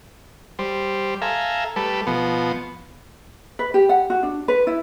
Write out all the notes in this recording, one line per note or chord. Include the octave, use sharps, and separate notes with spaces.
G3 C5
A4 E5 F5 G#5 A#5
G3 A3 A4 B4
B2 F3 B3
B4
G4
F#5
F#4
D4
B4
E4